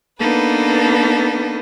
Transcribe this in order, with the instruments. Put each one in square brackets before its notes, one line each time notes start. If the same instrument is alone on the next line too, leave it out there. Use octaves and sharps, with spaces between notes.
[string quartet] A#3 B3 D4 D#4 A4 B4